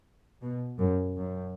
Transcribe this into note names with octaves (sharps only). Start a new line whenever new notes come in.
B2
F#2
F#2